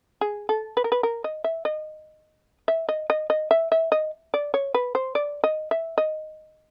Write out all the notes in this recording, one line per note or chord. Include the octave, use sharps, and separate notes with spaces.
G#4
A4
B4
A#4
B4
A#4
D#5
E5
D#5
E5
D#5
D#5
D#5
E5
E5
D#5
D5
C#5
B4
C5
D5
D#5
E5
D#5